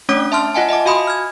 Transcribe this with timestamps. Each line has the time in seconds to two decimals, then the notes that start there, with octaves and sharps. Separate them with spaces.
0.09 A3 C#4 D4 C#5 D6 D#6
0.32 E5 A5 C6 F6
0.54 F4 D#5 F#5 G#5 A5
0.69 D#5 E5 A5 D6
0.86 F#4 F5 G#5 B5 C6 D#6
1.07 F6 G#6